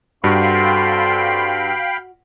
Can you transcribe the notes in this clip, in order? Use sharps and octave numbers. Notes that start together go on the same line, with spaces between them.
G2 C4 F#4 A4 F5 G5 B5 C6